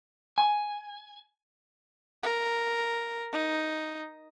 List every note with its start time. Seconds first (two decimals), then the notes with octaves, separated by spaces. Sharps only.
0.38 G#5
2.23 A#4
3.33 D#4